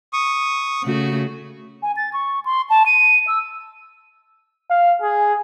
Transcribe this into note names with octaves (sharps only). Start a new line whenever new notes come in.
C#6 D#6
C#3 A3 F#4
G#5
A6
C#6
C6
A5
D#7
E6
F5
G#4